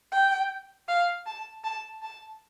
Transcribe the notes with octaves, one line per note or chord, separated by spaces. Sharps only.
G5
F5
A5
A5
A5